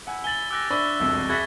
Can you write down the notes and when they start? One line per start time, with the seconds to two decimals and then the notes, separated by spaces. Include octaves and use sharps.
0.07 E4 F#5 G#5
0.24 G#5 A6 F#7 G7
0.51 G4 E6 F#6 A#6
0.70 D4 C5 E5 B5 C#6 D6 G7
1.00 E1 C2 F2
1.29 F#4 G#4 E5 B5 G#6 A6 B6